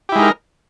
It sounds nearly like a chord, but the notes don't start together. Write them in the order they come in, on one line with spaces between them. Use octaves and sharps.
G4 E4 G#3 D#4 A#4